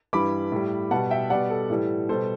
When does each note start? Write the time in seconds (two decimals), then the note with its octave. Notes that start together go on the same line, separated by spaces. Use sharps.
0.13 G2 E3 G3 B5 D6
0.52 A2 G3
0.91 B2 G3 F#5 A5
1.10 E5 G5
1.30 B2 G3 D5 F#5
1.50 A4
1.70 A2 E3 G3
2.09 B2 G3 A4 C5